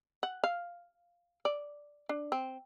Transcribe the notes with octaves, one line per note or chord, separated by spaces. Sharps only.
F#5
F5
D5
D4
C4